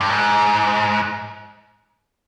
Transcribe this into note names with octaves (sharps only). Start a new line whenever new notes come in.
G2
G#2